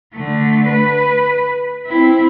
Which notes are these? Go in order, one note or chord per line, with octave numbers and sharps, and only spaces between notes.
D3 A3
B4
C4 E4